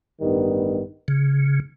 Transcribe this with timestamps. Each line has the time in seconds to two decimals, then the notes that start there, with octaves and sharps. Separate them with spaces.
0.21 A1 G2 D#3 G3 B3
1.08 C#3